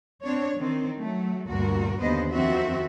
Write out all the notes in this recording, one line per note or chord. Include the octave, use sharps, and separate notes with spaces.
C4 D4 C#5
D#3 C4
F#3 A3
D2 G2 A#2 F#4 A#4
D#2 D3 B3 B4 C5 D#5
F2 D#3 F3 C4 F#4 E5